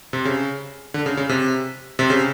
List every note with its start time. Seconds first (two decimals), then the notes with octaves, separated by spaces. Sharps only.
0.13 C3
0.25 C#3
0.94 D3
1.06 C#3
1.17 C#3
1.29 C3
1.99 C3
2.10 C#3